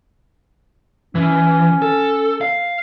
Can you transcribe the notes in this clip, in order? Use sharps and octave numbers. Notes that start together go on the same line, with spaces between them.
E3 C#4
A4
F5